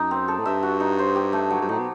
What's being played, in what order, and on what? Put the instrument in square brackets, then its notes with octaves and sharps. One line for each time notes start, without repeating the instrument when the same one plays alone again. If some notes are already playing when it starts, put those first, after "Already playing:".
Already playing: [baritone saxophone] F#2 [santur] D#4 G4
[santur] C4
A4
[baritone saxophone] A2
[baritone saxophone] G2 [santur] E5
[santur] F#4
D#4
C5
G4
A3
F#3
[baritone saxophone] G2
[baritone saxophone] A2 [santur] D#4
[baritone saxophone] B2